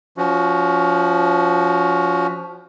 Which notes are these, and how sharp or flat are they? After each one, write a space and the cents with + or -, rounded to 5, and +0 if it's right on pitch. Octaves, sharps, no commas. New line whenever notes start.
F3 +0 C#4 +30 F#4 +0